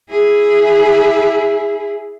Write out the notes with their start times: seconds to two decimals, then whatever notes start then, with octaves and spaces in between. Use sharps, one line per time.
0.10 E4 G#4